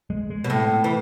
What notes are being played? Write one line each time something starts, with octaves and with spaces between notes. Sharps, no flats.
G#3
G#3
B2
A2 A3
E3